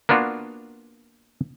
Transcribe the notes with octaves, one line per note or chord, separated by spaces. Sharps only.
A#3 B3 D4 F4 F#4